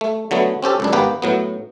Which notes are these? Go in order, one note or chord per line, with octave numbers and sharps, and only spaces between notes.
A3
D3 F#3 A3 B3
C4 C#4 G4 A4
C#2 F#2 D4
G#1 A#3 B3 G4 B4
A2 F#3 B3